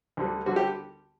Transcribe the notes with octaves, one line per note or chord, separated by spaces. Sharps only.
D2 D3 G3
D3 G3 F#4
G4